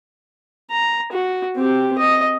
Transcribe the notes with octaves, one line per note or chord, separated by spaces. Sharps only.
A#5
F#4
C4 G4
D#5